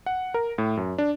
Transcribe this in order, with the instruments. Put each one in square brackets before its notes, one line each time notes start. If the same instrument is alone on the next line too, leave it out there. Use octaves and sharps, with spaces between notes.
[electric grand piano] F#5
A#4
A2
F#2
D4